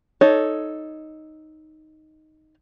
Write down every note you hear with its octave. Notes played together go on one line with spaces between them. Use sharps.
D#4 A4 C#5